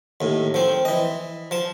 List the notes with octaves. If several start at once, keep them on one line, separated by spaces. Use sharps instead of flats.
D#2 A2
F3 C4
E3 D#5
F3 A5